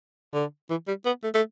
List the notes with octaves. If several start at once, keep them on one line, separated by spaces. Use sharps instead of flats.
D3
E3
G3
B3
A3
A3